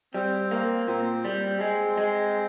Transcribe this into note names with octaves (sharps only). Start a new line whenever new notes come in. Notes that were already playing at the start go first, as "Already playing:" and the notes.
G3 C4
A#3
A#2 C4
G3
G#3
G#3